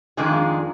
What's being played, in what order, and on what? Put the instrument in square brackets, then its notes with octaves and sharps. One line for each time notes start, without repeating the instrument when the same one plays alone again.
[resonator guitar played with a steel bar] F2 D#3 G#3 D4 G#4 [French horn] F4